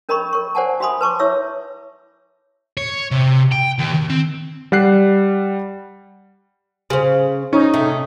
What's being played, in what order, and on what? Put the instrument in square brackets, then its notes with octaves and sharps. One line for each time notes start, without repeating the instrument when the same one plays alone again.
[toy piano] C#4 A#4 D#5 A#5 B5 C#6
A#4 C#6
C5 D5 F#5 G#5 A5
F#4 E5 G#5 B5 C6 D#6
B4 A5 C#6 D6
E4 C#5 E5 E6
[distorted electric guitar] C#5
C3
G5
D#2
D#3
C4
[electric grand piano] G3 F#5 F#6 C7
[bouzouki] C#3 [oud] G#4 C5
[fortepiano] C#4 [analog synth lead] D#4
[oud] C3 [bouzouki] A3